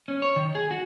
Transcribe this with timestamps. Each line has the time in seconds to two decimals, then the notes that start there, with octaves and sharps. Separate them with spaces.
0.08 C#4
0.22 C#5
0.36 D#3
0.55 G#4
0.71 F#4